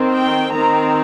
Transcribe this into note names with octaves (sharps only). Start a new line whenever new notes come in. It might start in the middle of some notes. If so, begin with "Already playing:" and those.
Already playing: D#3 C4
G5
D#3 C4 A#5